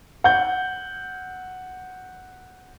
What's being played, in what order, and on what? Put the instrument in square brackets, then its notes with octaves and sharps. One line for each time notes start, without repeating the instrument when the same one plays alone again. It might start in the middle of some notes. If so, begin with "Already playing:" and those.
[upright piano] F#5 G6